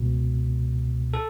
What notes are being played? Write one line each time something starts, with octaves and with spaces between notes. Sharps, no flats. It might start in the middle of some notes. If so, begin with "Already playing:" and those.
Already playing: C#2 B2
A4